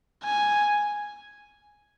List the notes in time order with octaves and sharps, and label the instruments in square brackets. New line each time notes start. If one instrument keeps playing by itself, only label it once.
[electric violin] G#5